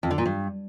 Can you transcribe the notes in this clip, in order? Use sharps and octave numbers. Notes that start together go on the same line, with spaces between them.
F2
D3
A#2
G2